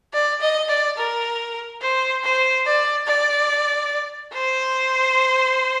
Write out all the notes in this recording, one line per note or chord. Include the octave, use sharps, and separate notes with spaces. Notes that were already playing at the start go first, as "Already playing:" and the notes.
D5
D#5
D5
A#4
C5
C5
D5
D5
C5